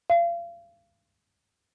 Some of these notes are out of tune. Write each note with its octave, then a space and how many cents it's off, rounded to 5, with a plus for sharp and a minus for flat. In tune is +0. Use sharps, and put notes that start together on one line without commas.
F5 -35